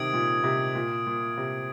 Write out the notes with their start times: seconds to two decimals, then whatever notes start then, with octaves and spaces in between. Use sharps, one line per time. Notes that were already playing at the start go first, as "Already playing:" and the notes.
Already playing: C3 D#3 D#6 G#6 D7
0.13 A#2
0.44 C3
0.75 A#2
1.06 A#2
1.37 C3